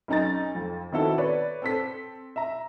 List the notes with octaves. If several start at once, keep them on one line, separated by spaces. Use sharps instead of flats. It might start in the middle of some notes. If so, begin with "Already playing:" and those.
B1 C#4 D#4 A#5 A6
F2
D#3 B3 C4 E4 F#4 A4
B4 C#5 D5
C4 A4 B6
E5 A#5